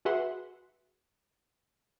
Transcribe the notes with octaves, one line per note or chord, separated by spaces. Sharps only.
F#4 G#4 B4 E5 F#5 C6